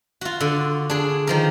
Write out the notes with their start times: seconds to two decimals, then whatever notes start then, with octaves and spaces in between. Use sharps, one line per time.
0.21 F4 F#4
0.40 D3
0.90 D4 G#4
1.27 D#3 F3 A#4